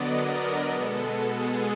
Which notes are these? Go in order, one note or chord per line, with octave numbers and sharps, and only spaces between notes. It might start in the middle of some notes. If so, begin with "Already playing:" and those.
Already playing: D3 F#3 B3 D5 D#5
A#4
B2 G#3 B3 A4
G#4